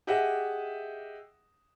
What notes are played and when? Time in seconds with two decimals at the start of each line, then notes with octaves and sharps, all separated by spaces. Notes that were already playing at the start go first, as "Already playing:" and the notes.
0.07 G4 G#4 D#5 E5 F#5